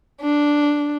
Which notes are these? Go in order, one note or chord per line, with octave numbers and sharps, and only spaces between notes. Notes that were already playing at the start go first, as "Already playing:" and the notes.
D4